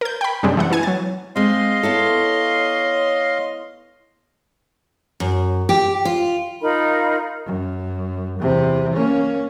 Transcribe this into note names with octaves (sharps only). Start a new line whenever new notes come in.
A#4 G6
G5 B5
F#2 C3 G3 G#3 C4 D4
E3 B3 F#5
E3 E4 G#5 G#6
F#3 A6
G#3 C4 D#5 F5 C6
B3 E4 A4 C#5
F#2
G4
F4
D#4 F4 A#4 B5
F#2
E2 C3
A#3 C#4